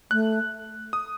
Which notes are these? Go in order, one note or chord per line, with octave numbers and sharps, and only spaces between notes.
A3 F#6
D#6